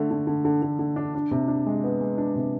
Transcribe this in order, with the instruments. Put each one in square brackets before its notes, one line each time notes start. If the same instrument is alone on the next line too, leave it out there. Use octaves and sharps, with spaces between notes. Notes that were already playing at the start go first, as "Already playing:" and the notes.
Already playing: [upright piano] D3 A3
D3
D3
D3
D3
D3
D4
D4
C3
D4
G#3
B3
G#3
D4
C3